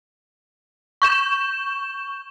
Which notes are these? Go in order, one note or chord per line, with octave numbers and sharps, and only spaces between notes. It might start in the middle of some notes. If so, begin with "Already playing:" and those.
C#6 G6 E7